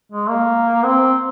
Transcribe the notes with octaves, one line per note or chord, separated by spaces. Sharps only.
G#3
A#3
C4